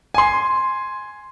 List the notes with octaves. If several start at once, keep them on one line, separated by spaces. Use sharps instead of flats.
G#5 C6